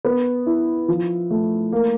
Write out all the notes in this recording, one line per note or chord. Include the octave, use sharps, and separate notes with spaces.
B3
E4
F3
A3
A#3